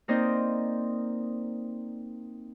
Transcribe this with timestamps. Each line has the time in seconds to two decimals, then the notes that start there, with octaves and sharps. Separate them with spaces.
0.08 A#3 C4 D#4 C5 D5 D#5